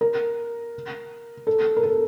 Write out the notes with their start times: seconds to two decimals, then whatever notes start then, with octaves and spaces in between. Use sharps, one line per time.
0.01 A#4
1.47 A4
1.77 A#4
1.83 A4